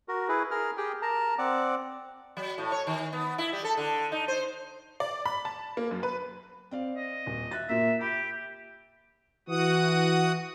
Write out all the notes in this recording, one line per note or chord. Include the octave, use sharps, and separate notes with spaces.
F#4 A#4
E4 G#4 B4
G#4 A#4 F6
G4 G#4 G5
A#4 A5 A#5
C4 D5 F#5 D6
F#3
A2
C#5
D#3
B3
E4
G3
A4
D3
D#4
C5
D5
B5
A5
A#3
F#2
B4
C4 D5 F5
D#5
D#1
E5 F#6 A6
A#2 A#3 E5
G4 B5
E3 F#4 F#5 D#6